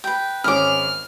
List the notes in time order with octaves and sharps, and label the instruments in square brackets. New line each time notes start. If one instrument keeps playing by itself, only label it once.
[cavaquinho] B4 G5
[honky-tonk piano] G#1 C#4 [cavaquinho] G#4 D6 [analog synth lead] F6